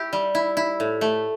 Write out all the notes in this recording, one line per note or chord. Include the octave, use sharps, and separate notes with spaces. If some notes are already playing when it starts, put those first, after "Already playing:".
Already playing: E4 G4
G3
E4
E4
A2
A3